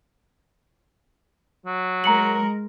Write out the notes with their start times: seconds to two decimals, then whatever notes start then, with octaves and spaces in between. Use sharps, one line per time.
1.66 F#3
2.04 G#3 A#4 A#5 C#7 F#7